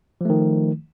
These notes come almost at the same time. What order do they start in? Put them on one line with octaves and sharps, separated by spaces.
F3 A3 D#3